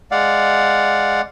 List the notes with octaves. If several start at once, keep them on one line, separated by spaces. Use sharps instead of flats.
G#3 D5 F5 F#5